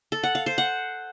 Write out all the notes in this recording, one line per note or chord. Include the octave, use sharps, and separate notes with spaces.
A4
F#5
F5
C5
F#5